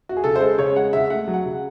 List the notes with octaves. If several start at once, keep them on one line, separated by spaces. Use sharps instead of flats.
F#4
G#4
C#3 A4
C5
G#3 A4
C#3 C#5
G#3 F#5
C#3 E5
A3 F#5
F#3
F#5
C#3